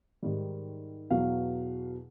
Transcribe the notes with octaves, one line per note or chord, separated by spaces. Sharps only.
G#2 D#3 G3
E2 B2 F#3 F5